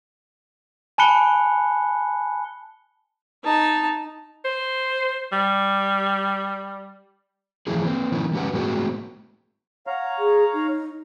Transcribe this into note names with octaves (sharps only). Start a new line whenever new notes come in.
G#5 A5 B5 F#6 C#7 G7
D#4 A5
C5
G3
E3 F3 A3 C#4 E4 G#4
A#3 C4
D#3 F3 C#4 D#4 E4
G#3 C#4 G4 A#4 B4 F#5
A2 G#3 A#3 C4 F#4 G#4
C#5 F5 F#5 A#5
G#4
D#4